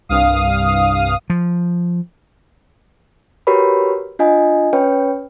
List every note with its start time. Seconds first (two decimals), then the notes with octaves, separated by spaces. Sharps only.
0.09 C2 G2 F5 D#6
1.30 F3
3.47 F#4 G4 A#4 B4 C#5 B5
4.19 D4 F4 D#5 G#5
4.73 C#4 B4 C#5 G5